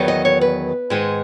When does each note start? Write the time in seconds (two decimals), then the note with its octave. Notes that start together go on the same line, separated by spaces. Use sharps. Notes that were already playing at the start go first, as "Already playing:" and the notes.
Already playing: E2 D#3 F#3 B3
0.08 D#5
0.25 C#5
0.41 B4
0.90 G#2 D#3 G#3